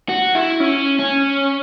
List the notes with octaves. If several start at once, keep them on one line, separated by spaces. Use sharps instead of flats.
F#4
E4
C#4
C#4